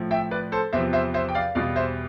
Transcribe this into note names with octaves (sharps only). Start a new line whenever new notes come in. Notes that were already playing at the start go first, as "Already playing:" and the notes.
Already playing: A2 F3
E5 G5
B4 D5
A4 C5
E2 C3 F3 C5 E5
C5 E5
C5 E5
G5
D5 F5
E2 B2 G3 D5 F5
C5 E5